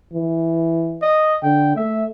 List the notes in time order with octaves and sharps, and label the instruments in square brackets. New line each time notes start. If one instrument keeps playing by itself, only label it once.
[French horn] E3
[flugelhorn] D#5
[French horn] D3 [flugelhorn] G5
[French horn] A3 [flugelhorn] E5